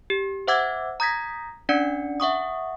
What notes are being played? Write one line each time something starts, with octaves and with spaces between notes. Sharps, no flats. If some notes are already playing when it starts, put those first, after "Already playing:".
G4
C5 E5 F#5 D6 E6 G#6
A#5 D#6 G6 G#6 A#6 B6
C#4 D4 D5 F#5 C#7
E5 F#5 C#6 D#6